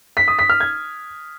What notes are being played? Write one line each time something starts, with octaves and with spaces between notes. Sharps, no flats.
B6
D#6
B6
F6
G#6